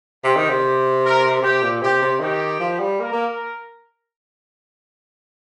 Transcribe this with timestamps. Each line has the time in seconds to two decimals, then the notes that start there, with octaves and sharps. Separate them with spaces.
0.24 C3 G4
0.36 D#3
0.50 C3
1.03 A#4
1.41 C3 G4
1.62 A#2
1.81 C3 G4
2.02 C3
2.20 D#3 G4
2.60 F3
2.80 G3
3.00 A#3 A#4
3.13 A#3